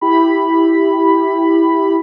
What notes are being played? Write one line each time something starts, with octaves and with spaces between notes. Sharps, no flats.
E4 G4 B5